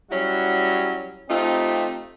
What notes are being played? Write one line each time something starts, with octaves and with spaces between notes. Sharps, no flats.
F#3 G3 C#4 E4 F#4
A3 C4 D#4 F4 G4